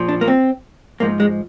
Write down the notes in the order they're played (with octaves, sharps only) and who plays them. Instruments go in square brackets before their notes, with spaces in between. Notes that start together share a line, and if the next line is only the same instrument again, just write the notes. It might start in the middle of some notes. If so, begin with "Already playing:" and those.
Already playing: [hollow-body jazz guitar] A#2 F3
D4
A#3
C4
G#2 F3 A#3
G#3